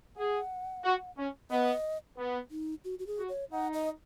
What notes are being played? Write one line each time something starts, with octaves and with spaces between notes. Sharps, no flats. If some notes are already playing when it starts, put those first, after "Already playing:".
G#4 F#5
F#4
C#4
B3 D#5
B3
D#4
F#4
F#4
G#4
F#4
C#5
D#4 F#5
D#5